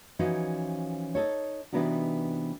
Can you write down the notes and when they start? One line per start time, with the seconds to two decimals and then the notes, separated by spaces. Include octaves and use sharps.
0.19 E3 F3 C#4 D#4 F#4
1.15 D#4 A4 C#5
1.72 C3 E3 B3 D4 D#4 F#4